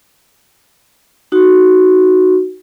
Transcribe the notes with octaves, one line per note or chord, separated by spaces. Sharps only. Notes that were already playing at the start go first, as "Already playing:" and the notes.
D#4 F#4